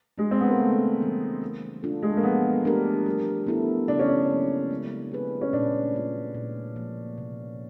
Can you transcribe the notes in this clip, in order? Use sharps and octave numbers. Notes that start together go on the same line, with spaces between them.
G#3 D4 F#4
C4
B3
A#3
C#3 A3
E3 G3 A#3
A3
D4 F4 A4
G#3
A3
A#3
F3 B3
A3 D4 G4 A#4
G3
B3 E4 A4
C#3 D4
C#4
D4
F#3 A#3
G#3
C4 E4 G#4 B4
C#4
A#2 D4
G3 A#3 C#4 F4
A#2
F3 A#3
C3